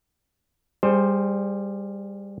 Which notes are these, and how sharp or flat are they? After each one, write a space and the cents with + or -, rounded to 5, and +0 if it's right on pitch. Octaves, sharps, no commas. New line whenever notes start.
G3 +20 G#4 +0 C5 +0